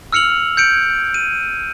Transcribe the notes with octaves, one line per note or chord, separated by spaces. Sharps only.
E6 F6 C#7 F7 F#7
G6 C#7 D7
D#7